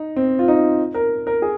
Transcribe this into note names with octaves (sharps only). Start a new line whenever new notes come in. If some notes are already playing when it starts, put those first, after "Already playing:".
Already playing: D#4
C4
F4
D#4
A#4
A#4
G#4